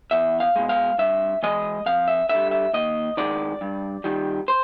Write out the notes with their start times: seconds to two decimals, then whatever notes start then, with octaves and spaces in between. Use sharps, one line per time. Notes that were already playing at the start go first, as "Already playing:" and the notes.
0.11 E2 E5
0.40 F5
0.56 B2 G#3
0.69 F5
0.98 G2 E5
1.43 E3 G#3 D#5
1.86 F2 F5
2.08 E5
2.29 D3 G3 E5
2.51 E5
2.73 D#2 D#5
3.17 D#3 G#3 D5
3.61 G2
4.04 D#3 G3
4.48 C5